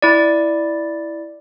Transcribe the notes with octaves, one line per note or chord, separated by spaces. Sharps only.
E4 D5